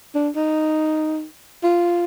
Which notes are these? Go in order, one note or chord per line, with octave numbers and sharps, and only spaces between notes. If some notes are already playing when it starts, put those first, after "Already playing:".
D4
D#4
F4